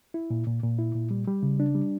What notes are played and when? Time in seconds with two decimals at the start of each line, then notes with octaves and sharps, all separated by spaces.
0.14 E4
0.30 A#2
0.47 A#2
0.63 A#2
0.79 E4
0.95 A#2
1.11 G3
1.27 G3
1.43 C#3
1.60 D4
1.75 G3